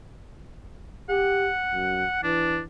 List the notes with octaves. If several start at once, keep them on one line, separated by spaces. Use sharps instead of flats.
G4 F#5
F#2
E3 D4